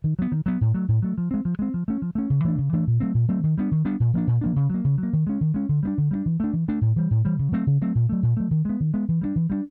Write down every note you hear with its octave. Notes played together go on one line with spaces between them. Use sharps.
D#3
F#3 B3
D#3
F#3 B3
A2
F#3 A3
A2
F#3 A3
F3
G#3 C4
F3
G#3 C4
F3
A3 C#4
F3
A3 C#4
C#3
E3 A3 D4
C#3
E3 A3 D4
A#2
F#3 A3 C4
A#2
F#3 A3 C4
D#3
G3 B3 D4
D#3
G3 B3 D4
A#2
F3 A#3 D4
A#2
F3 A#3 D4
C#3
F#3 A#3
C#3
F#3
A#3
D#3
G#3 C#4
D#3
G#3 C#4
D3
G3 B3 D4
D3
G3 B3 D4
E3
A3 D4
E3
A3 D4
A2
E3 G3
A2
E3 G3
C#3
F#3 A3 C4
C#3
F#3 A3 C4
A#2
F#3 A3
A#2
F#3 A3
D#3
G#3 B3
D#3
G#3 B3
E3
G3 B3 D4
E3
G3 B3 D4